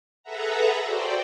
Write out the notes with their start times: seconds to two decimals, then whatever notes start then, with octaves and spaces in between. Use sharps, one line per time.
0.23 G#4 A4 B4 E5 F#5 A#5
0.82 F#4 C5 D5 G5